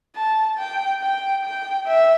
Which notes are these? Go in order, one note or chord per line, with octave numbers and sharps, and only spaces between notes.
A5
G5
G5
G5
E5